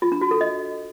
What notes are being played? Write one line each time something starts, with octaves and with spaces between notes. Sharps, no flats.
F4
D4
F#4
A4
D#5